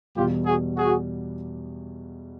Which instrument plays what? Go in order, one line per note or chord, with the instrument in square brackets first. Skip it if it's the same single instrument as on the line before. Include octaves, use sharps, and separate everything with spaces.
[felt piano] E2 B2 G3 B3 [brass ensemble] F4 G4
[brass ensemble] F#4 G#4
F#4 G#4